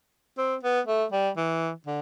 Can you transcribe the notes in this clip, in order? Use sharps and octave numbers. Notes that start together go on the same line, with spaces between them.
C4
B3
A3
G3
E3
D3